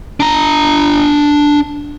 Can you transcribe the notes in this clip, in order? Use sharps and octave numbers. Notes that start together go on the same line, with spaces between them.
D4 A#5